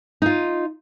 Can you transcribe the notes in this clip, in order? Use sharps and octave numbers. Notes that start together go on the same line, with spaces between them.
D#4 F4